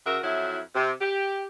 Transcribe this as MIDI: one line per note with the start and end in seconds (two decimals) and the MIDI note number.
0.05 0.18 49
0.05 0.18 66
0.05 0.18 70
0.05 0.18 76
0.22 0.59 41
0.22 0.59 54
0.22 0.59 64
0.75 0.91 48
1.00 1.47 67